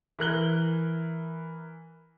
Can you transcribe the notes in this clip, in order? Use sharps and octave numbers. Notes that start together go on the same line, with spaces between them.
E3 A#4 F#6 G7